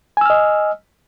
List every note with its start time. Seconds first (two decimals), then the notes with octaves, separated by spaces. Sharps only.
0.17 G#5
0.21 E6
0.26 F6
0.30 D#5